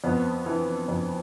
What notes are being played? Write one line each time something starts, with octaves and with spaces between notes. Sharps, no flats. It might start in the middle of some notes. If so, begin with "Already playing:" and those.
F2 B3
E3
F2